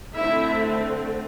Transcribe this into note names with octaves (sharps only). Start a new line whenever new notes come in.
D3 A3 C4 E4 E5